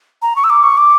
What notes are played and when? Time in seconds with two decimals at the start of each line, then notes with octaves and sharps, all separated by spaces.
0.22 A#5
0.36 C#6
0.44 E6
0.50 D6
0.63 C#6
0.77 D6